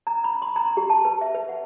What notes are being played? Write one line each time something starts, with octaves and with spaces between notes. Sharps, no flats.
A#5
B5
C6
A#5
G4
A5
B4
E5
B4
F#5